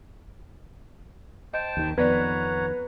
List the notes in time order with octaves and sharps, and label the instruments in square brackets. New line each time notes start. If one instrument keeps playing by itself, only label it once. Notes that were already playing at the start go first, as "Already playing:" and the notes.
[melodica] C5 G5 A5 [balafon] D#5
[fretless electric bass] D#2 D#3
[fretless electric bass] F2 D#3 [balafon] B3 D5 [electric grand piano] B4 [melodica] C#5 F#5 A#5